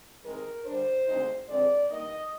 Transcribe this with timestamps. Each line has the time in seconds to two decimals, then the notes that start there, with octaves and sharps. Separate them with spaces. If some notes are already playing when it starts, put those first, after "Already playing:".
0.24 C3 D#3 G#3 D#4 A#4
0.65 D3 G3 D4 C5
1.07 D2 D3 G#3 C4 D#4
1.47 F2 D3 G#3 C4 D5
1.89 G2 D#3 A#3 D#4 D#5